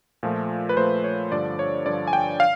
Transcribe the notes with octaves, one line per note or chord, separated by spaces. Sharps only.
A#2 F3 A3
B4
A#2 F3 A3 C5
C#5
G2 D3 F3 D5
C#5
G2 D3 F3 D5
G#5
G5
F5